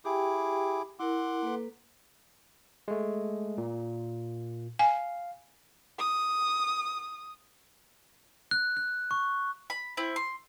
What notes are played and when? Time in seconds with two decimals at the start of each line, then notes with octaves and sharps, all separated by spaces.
0.05 E4 G4 G#4 G5 A5 D6
1.00 E4 A#4 F#5 C6 D6
1.42 A#3 A4 B4
2.88 G#3 A3
3.58 A#2
4.79 F5 G#5
5.99 D#6
8.51 F#6
8.77 F#6
9.11 C#6
9.70 B5
9.97 C4 E4
10.16 C6